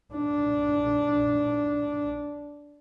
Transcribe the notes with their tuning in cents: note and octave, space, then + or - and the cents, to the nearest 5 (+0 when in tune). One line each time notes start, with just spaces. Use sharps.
D4 -10